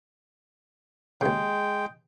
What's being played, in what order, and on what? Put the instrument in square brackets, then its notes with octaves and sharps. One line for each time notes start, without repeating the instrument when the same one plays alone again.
[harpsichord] D#2 C#3 [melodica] G#3 G5